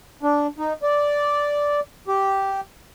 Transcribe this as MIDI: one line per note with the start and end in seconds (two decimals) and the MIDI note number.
0.23 0.47 62
0.58 0.73 63
0.82 1.80 74
2.08 2.61 67